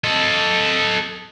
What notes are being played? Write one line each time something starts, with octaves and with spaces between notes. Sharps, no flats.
A4 D#5